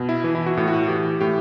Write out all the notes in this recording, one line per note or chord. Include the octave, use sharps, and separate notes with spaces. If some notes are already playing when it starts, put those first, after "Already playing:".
Already playing: B2
E4
E3
E4
F#4
A2
F#4
E3 G4
A2 G4